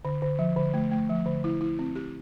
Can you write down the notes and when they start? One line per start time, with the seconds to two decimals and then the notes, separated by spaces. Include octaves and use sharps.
0.05 D3
0.22 D3
0.39 F3
0.56 D3
0.74 A3
0.91 A3
1.09 F3
1.26 D3
1.44 E4
1.61 E4
1.79 C4
1.95 G4